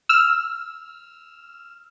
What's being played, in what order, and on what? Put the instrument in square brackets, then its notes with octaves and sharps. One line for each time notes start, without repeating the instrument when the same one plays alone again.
[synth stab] E6 F6